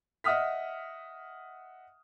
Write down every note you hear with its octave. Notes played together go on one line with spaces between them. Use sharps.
D#5 E5 F#5 D#6 F6 B6